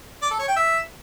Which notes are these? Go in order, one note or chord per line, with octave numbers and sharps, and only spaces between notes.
D5
A4
C#5
G5
E5